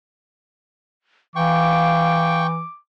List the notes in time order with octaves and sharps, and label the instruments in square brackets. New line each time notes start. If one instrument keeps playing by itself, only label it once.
[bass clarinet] E3 [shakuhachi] F5 [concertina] G5 C#6 [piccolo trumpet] D6